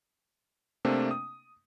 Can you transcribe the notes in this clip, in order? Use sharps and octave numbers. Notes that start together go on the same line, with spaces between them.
C3 A3 A#3 C4 D4
D#6